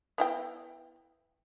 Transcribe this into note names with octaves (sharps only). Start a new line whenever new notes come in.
B3 E4 G5